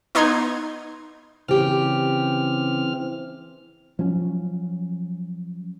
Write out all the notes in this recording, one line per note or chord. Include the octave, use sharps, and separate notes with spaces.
B3 D#4 C6 G#6
C#3 E3 C4 G4 F6
F3 F#3 C#4